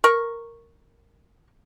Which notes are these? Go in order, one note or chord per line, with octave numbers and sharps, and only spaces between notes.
A#4 C#6